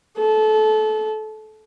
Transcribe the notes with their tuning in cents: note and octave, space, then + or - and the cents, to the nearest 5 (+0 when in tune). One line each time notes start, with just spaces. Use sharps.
A4 -25